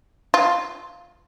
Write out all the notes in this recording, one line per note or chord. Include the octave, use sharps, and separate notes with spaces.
F4